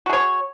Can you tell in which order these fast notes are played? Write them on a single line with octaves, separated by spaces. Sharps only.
F#4 G#4 C#5